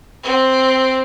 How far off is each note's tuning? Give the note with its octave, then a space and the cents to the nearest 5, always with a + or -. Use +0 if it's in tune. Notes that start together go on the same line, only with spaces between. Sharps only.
C4 +0